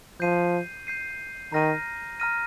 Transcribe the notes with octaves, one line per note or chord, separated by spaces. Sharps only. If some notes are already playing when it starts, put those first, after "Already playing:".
F3 G6 C7 D#7
G6 C7 D#7
D#3 A#5 F6 A#6 D#7
A#5 F6 A#6 D#7